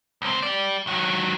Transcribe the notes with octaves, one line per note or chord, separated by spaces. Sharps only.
C#2 C4
G4 D5
D#3 F#3